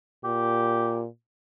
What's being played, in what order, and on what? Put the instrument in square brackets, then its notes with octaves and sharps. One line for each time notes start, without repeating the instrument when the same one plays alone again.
[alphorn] A#2 [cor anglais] G4